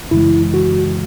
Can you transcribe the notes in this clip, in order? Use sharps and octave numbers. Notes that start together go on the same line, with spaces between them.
F#2 C#3 E3 G#3 E4
F#4